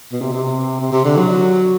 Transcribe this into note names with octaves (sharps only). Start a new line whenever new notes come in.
B2
C3
C3
C3
C3
D3
F#3